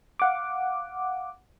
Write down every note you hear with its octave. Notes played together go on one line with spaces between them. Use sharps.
F5 F#5 D6